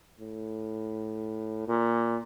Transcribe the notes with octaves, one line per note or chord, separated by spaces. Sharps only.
A2
A#2